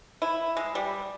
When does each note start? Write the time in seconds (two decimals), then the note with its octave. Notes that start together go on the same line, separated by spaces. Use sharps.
0.22 E4
0.57 G#3
0.75 G3